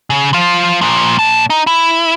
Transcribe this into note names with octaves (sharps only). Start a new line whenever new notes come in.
C#3
F3 F4
A#2 F3
A#2 A5
D#4
E4